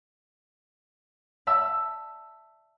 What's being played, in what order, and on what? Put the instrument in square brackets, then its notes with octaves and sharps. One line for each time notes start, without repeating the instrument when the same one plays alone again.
[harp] D5 E5 A5 E6